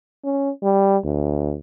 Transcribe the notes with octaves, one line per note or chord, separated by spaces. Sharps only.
C#4
G3
D2